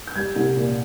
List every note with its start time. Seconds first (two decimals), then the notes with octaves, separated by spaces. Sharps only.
0.07 G6
0.16 G3 G#6
0.36 C2
0.57 A#2